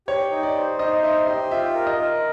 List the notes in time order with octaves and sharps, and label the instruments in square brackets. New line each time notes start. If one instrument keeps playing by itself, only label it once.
[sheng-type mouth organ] G4 [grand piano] C#5
[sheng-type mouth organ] D#4
[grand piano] D5
[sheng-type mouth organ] C5
[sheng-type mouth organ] D#4 [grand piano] D#5
[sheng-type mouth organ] C5 [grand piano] E5
[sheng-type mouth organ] G4 [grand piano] D#5
[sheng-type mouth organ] F4 [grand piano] E5
[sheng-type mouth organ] A#4
[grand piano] D#5
[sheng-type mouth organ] A#4